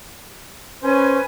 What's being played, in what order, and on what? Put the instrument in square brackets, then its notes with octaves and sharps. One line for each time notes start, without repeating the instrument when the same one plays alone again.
[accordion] C#4 [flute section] B4 G#5 [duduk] C5